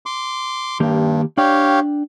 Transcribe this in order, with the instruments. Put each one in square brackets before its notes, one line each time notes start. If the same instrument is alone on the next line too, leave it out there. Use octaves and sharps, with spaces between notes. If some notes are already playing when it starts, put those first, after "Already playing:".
[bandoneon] C6 D6
[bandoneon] G2 [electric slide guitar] D#3 A#3 G4
[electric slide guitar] D4 D5 G5 [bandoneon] G4 C#5 F5